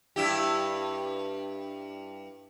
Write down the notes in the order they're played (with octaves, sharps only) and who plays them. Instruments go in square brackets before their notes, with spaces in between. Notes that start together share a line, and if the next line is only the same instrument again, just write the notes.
[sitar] G2 E4 G4